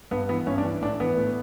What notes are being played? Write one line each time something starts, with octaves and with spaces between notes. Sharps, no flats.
G2 B3
E3 B3
G2 C#4
D4
E3
A2 D4
E3 B3
A2